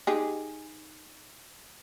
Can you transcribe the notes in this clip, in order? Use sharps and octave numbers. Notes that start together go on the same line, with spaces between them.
D#4 G4 G#4